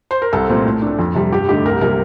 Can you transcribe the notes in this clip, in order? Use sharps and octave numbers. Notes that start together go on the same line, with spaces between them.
C5
A#4
C2 A4
A#2 A3 C4
A2
A3 D4
F2
C3 G3
G2 G4
D3 A3 D#4 G4
C2 A#4
C3 G3 A#3 A#4